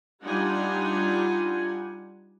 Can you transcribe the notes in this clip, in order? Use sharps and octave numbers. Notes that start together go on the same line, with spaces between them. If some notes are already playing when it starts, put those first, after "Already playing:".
G3 D4 D#4 F4 F#5 G#5